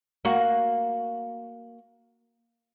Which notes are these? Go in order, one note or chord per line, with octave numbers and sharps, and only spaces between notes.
A#3 F#4